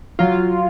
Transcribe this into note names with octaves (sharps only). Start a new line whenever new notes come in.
F#3 F4